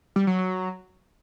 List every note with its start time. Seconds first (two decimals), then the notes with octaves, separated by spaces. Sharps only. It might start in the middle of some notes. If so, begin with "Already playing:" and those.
0.16 G3
0.27 F#3
0.39 F#3